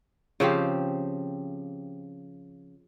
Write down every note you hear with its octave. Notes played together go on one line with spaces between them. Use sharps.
C#3 F3 C4 G4